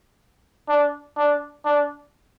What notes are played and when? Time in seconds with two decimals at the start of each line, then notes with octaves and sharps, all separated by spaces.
0.69 D4
1.17 D4
1.65 D4